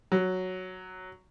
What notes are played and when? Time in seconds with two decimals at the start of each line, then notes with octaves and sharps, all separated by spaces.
0.12 F#3